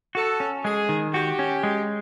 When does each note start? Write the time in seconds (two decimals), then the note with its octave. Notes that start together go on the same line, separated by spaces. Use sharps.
0.15 F#4 A4
0.40 C#4
0.64 G#3 G#4
0.89 D#3
1.14 F#4 G4
1.39 C#4
1.63 G#3